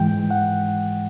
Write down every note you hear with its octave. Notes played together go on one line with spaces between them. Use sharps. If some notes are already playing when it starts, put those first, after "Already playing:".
Already playing: G#2 E3 G#3 G5
F#5